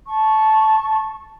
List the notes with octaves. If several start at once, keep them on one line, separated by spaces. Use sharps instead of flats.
A5 C#6